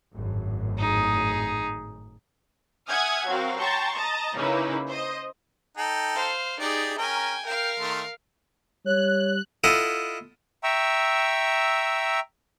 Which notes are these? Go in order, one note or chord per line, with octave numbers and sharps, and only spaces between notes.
G#1 F#2 A2
D#4 G#4
E5 F#5 G#5 D#6 F6 G#6
F#3 C4 F#4 A#4 F5
G5 A5 A#5 C6 C#6
D#5 A5 A#5
C#3 A#3 C#4 D#4 E4 B4
C5 D#5
D#4 A4 G5
C5 F5
D#4 G4 G#4 D5
C#4 A#4 G5 G#5 A#5
A#4 F5 G5
D#3 A3 C6
G3 C#5 F#6
E4 F4 A4 D#5 F#5
E5 G5 A#5 C#6 E6